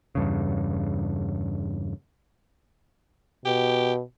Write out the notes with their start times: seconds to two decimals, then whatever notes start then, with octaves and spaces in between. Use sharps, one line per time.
0.15 E2 G2 C#3
3.46 B2 G4